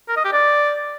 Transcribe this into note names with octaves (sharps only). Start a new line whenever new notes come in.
A#4
D#5
G4
D5